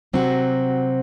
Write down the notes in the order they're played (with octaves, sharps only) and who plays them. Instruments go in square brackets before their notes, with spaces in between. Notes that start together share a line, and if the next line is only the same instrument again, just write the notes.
[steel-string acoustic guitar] C3 F#3 C4 F#4